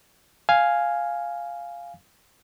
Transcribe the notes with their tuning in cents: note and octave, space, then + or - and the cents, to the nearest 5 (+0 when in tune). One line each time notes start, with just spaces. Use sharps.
F5 +0 G#5 +0